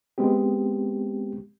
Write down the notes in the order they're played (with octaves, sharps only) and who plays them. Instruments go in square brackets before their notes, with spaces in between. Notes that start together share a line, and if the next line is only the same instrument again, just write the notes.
[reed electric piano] G#3 B3 C4 G4